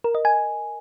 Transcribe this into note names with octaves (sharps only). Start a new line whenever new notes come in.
A#4
D#5
G#5